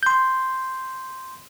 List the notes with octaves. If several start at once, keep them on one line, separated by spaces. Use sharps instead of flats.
C6 G6